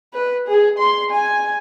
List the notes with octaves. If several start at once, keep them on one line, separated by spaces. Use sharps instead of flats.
B4
G#4
C6
G#5